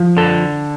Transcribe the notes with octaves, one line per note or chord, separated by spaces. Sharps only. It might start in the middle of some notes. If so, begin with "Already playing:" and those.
Already playing: F3
D3 A4